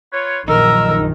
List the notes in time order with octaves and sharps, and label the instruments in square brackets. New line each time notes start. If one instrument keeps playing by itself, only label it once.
[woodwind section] F4 B4 C#5
[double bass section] A#1 F#2 D#3 [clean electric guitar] D#4 [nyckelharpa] A#4 [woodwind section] E6